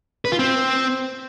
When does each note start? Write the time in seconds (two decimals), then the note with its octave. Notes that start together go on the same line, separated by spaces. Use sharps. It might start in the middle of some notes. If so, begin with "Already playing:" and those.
0.25 B4
0.32 F4
0.39 C4